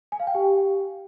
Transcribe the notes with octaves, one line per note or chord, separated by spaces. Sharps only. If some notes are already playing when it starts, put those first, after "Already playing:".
G#5
F5
G5
G4